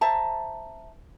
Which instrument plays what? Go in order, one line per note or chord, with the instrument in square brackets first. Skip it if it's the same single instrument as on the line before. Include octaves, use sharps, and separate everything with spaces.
[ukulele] C5 E5 A5 A#5